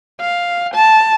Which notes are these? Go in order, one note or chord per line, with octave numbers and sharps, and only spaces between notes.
F5
A5